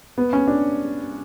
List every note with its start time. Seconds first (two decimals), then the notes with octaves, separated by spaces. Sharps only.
0.18 B3
0.33 C#4
0.47 D4